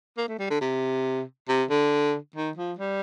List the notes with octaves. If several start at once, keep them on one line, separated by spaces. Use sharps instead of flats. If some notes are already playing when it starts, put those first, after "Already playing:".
A#3
A3
G3
D3
C3
C3
D3
D#3
F3
G3